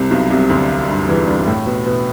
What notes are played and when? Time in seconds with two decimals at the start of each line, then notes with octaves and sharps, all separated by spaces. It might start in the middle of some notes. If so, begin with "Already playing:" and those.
Already playing: C2 C3
0.11 B1 B2
0.30 C2 C3
0.49 D2 D3
0.88 G2
1.08 E2 E3
1.27 G2 G3
1.47 A2 A3
1.66 B2 B3
1.86 B2 B3